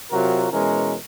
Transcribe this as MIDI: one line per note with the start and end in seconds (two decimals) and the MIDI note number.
0.12 0.48 48
0.12 0.48 54
0.12 0.48 65
0.12 0.48 66
0.12 0.48 70
0.52 0.95 47
0.52 0.95 52
0.52 0.95 56
0.52 0.95 61
0.52 0.95 70